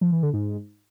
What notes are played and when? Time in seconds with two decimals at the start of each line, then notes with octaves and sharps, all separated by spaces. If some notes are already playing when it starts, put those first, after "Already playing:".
0.01 F3
0.12 E3
0.23 D3
0.33 G#2